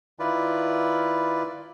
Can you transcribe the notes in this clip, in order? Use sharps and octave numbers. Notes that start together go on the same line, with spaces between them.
D#3 E4 F4 B4 D5